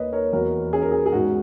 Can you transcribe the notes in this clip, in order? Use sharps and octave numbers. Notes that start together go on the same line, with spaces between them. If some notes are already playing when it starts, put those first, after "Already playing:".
Already playing: D#2 A#3 B4 C#5 D#5
A#4 C#5
E2 F#4 A#4
C#4 G#4
A#4
G#4
G#4
G#2 F#4